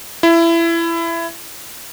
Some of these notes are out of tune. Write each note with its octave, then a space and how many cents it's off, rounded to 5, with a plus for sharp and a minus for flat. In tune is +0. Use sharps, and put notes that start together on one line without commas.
E4 +20